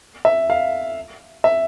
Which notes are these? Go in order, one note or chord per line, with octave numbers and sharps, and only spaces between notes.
E5
F5
E5